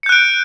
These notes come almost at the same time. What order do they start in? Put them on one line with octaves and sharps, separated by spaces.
C#7 G6 F#6 D7